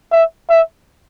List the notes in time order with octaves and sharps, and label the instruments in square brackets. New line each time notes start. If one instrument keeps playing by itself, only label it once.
[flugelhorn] E5
E5